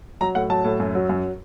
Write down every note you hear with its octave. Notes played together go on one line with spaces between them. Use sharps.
F#3 A#5
A2 F#5
F#3 A5
A2
F#2
F#3
F#2